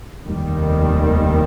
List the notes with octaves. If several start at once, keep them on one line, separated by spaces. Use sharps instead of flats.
F1 D#2 D#3 G3